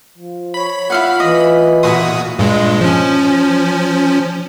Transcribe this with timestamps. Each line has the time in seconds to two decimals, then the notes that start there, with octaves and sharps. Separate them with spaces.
0.18 F3
0.54 C#5 B5
0.90 E4 F4 F5 F#5
1.20 E3 D#5
1.83 A#2 E4 F#4 A4 C6 D#6
2.39 G2 A#2 G#3
2.81 F3 C#4